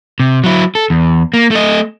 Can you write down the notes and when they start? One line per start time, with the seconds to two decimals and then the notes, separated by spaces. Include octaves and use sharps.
0.20 C3
0.44 F#3 E4
0.75 A4
0.90 E2
1.34 A#3
1.51 A3 D#5